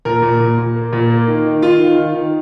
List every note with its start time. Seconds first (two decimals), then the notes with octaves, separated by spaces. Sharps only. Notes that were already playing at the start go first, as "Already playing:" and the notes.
0.05 A#2 A#4
0.22 A#2
0.40 A#2
0.58 A#2
0.76 A#3
0.93 A#2
1.10 A#3
1.27 D#3
1.46 D#3
1.62 D#3 F4
1.80 D#3
1.97 D#3
2.15 D#3